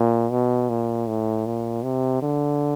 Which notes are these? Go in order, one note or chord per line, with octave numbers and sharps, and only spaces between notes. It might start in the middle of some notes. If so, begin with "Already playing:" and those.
Already playing: A#2
B2
A#2
A2
A#2
C3
D3